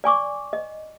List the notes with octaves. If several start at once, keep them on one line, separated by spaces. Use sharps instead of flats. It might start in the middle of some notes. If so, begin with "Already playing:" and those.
D5 G#5 C#6 D6
D#5